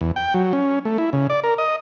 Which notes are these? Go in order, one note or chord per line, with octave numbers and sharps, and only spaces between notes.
E2
G5
F#3
C#4
A3
E4
C#3
D5
A#4
D#5